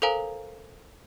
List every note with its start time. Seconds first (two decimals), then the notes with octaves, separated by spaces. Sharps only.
0.02 A4 A#4 C5 F5 G#5 A#5